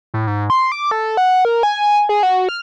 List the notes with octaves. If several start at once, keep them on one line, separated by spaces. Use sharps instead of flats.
A2
G#2
C6
D6
A4
F#5
A#4
G#5
G#4
F#4
F6